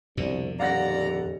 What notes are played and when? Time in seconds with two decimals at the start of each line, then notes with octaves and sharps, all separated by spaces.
0.17 C2 F2 B2 D3
0.60 D#1 D5 F5 F#5 A#5 A#6